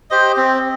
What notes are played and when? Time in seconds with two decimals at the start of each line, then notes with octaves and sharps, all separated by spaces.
0.10 G4 C5 D#5
0.37 C4